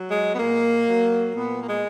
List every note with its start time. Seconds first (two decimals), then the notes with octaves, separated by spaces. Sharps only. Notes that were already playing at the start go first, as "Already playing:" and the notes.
Already playing: F#3
0.08 G#3
0.33 B3
0.39 A#2 A#3
0.88 F#3
1.35 A#2 B3
1.61 A#3
1.66 G#3